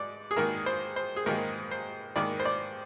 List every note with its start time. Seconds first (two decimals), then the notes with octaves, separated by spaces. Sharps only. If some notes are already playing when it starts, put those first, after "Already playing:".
Already playing: G#2 D5
0.31 G#4
0.36 G#2 D#3 A#3 A#4
0.66 C5
0.96 C5
1.16 G#4
1.26 G#2 D#3 A#3 A#4
1.71 C5
2.16 G#2 D#3 A#3 D5
2.40 C5
2.45 D5